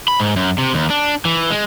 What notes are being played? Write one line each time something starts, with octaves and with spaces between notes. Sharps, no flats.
B5
G#2
F#2
C3
D#2
D4
E3
G#3